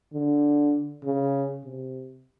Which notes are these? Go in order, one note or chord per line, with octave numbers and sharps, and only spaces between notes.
D3
C#3
C3